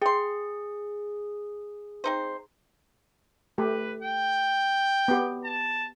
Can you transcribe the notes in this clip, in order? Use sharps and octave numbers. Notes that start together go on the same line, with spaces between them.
G#4 G5 C6
C4 D#4 C5
A3 G4 B4
G5
B3 G4
A5